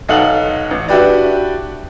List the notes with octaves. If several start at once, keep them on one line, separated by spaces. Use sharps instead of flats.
B1 D#4 A4 F5 F#5 F#7
A1
D4 E4 F#4 G4 B4 D5